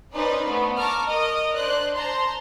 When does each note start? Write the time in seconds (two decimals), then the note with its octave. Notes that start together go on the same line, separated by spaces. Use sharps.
0.13 C#4 D#4 B4 C5 D5
0.47 A3 B3
0.78 A5 A#5 C#6 D6 F6
1.08 A#4 D#5
1.56 D4 C5 D5 F#6
1.95 C5 A5 A#5 C6